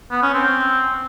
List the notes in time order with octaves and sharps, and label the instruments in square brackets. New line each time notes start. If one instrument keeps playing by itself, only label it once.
[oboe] B3
C#4
C4